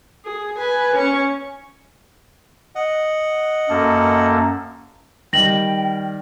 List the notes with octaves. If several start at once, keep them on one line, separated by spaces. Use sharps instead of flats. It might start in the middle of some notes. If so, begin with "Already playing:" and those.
G#4
B4 G#5
C#4 C#6
D#5 F#5
F#2 A#3 A4
D#3 G3 G5 A#6 F#7